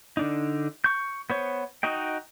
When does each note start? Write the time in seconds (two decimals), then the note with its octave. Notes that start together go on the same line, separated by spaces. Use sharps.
0.17 D3 D4 D#4
0.84 C#6 G6
1.30 B3 C5 C#5
1.83 D#4 F#4 D#5 G5